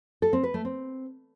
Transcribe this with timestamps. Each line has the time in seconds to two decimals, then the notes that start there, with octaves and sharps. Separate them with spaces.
0.22 A4
0.33 C4
0.43 B4
0.54 A3
0.65 C4